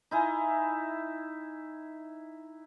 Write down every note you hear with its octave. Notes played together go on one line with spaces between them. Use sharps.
D#4 E4 G#5